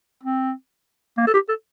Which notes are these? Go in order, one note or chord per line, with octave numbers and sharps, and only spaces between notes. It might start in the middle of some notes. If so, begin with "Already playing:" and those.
C4
A#3
A4
G4
A4